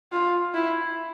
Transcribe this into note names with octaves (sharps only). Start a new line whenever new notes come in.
F4
E4